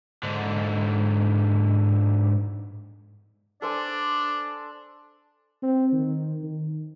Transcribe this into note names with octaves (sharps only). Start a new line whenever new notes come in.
G#2 D3
D4 A4 C5 D5 G#5
C4
D#3
D#3